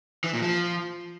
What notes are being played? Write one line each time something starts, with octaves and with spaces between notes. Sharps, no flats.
E3
A#2
F3